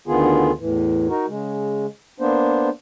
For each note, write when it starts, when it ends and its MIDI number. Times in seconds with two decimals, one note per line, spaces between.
0.08 0.52 38
0.08 0.52 50
0.08 0.52 51
0.08 0.52 59
0.08 0.52 65
0.08 0.52 68
0.59 1.08 40
0.59 1.08 45
0.59 1.08 52
1.09 1.26 63
1.09 1.26 66
1.09 1.26 70
1.28 1.86 49
1.28 1.86 56
2.20 2.69 58
2.20 2.69 59
2.20 2.69 62
2.20 2.69 72